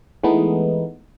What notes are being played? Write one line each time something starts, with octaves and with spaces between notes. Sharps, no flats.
E3 G#3 A3 B3 D#4